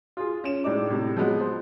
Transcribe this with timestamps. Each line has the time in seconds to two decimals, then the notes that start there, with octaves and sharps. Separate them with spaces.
0.17 F4 G#4
0.44 C#4 E7
0.64 A2 G#3 D4 D#4 D6
0.90 A2 C3
1.16 F3 F#3 G#3 B3
1.40 C5